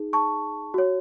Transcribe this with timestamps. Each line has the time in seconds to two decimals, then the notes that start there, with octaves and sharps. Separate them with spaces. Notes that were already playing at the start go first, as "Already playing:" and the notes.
Already playing: D#4 G#4
0.13 A5 C#6
0.74 F#4 C#5